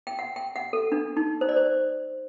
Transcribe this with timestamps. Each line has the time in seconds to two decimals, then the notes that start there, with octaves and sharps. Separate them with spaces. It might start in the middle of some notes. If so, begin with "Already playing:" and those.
0.07 G5
0.19 F#5
0.36 G5
0.56 F#5
0.73 A4
0.92 D4
1.17 D#4
1.41 C5
1.49 D5
1.56 C5